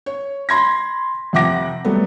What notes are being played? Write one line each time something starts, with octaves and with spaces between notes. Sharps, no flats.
C#5
B5 C6 G#6 A#6
F2 C3 F#5 G5 D6 A#6
F#3 G3 A3 B3